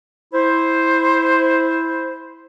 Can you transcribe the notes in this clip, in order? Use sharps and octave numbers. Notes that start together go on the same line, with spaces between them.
E4 C5